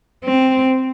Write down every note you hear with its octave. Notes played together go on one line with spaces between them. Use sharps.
C4